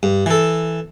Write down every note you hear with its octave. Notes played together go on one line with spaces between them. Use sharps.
G2
E3 A4